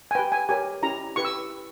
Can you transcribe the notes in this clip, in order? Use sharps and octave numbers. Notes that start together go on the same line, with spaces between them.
G#5
G4 B4 G5
G#5
G4 A#4 C#5 G#5
C#4 E4 G4 A#5
E4 G4 B4 C#6
E6